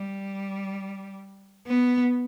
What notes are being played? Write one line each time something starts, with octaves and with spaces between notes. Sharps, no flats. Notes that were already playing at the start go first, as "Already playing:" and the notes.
Already playing: G3
B3